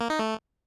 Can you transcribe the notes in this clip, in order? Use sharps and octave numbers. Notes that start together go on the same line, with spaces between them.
A#3
D#4
A3